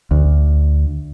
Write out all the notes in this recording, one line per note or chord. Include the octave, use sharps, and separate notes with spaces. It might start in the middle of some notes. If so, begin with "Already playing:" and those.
D2